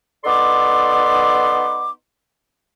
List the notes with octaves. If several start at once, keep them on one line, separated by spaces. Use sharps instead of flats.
B3 D#4 A4 D5 C6 D6